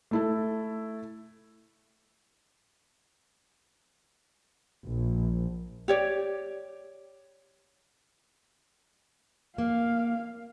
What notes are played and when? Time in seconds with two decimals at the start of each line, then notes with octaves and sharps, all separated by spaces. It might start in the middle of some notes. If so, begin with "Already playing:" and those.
0.11 A3 E4 A4
4.85 A#1
5.88 G4 C#5 D5
9.58 A#3 F5